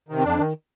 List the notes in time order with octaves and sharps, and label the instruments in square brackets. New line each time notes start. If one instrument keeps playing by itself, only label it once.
[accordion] C3 D#3
C4
F2 D4
D#3